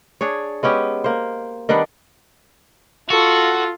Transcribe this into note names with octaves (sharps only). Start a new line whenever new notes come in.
D4 G#4 C#5
G#3 B3 C#4 G4
A#3 C5
D#3 G3 B3 D4
F4 F#4 A4